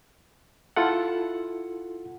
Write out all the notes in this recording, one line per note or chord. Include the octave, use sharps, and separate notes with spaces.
E4 F4 A4 F#5